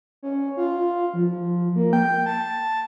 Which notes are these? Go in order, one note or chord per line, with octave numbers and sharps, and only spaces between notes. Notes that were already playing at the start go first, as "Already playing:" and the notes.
C#4
F4
F3
A#3
G5
A5